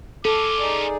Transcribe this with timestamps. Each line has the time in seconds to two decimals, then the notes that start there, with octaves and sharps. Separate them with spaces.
0.25 C#4 F4 A4 D6
0.60 D#4 G#4 D5